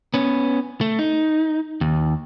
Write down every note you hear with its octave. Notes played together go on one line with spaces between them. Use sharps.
B3 C#4
A3
D#4
D#2